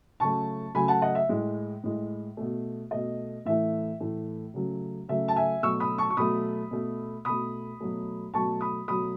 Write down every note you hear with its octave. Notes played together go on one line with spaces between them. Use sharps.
C#3 F#3 A3 A5 C#6
C#3 F#3 A3 G#5 B5
F#5 A5
D#5 F#5
E5
A2 G#3
A2 G#3
B2 A3
B2 A3 D#5
A2 E3 A3 E5
A2 E3 A3
C#3 F#3 A3
C#3 F#3 A3 E5
A5
E5 G#5
B2 F#3 A3 C#6 E6
B5 D#6
A5 C#6
C#6
B2 F#3 A3 B5 D#6
B2 A3
B2 A3 B5 D#6
B2 F#3 A3
B2 F#3 A3 A5 C#6
B5 D#6
B2 F#3 A3 B5 D#6